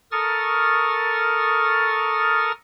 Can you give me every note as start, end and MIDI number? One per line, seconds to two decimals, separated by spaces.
0.12 2.52 69
0.12 2.52 70
0.12 2.52 85
0.12 2.52 87
0.12 2.52 89
0.12 2.52 93